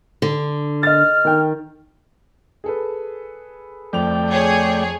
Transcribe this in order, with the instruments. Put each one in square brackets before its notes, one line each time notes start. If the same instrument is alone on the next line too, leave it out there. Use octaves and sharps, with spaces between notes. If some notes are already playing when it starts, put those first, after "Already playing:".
[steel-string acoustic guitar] D3
[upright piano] D#5 A6 [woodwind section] F6
[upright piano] D#3 G5
[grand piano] G#4 A4 B4
[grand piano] F2 F7 [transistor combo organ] A3 D5 G5
[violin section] G#4 C#5